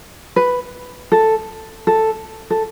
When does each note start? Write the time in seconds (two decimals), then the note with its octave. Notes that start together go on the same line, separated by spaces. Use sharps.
0.36 B4
1.12 A4
1.87 A4
2.50 A4